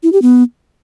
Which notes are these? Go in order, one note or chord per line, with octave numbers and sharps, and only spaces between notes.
E4
G4
B3